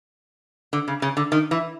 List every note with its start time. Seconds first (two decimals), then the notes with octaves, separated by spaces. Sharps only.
0.73 D3
0.88 C#3
1.02 C#3
1.17 D3
1.32 D#3
1.51 E3